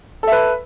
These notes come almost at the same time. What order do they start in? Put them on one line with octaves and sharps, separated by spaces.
A4 E5 B4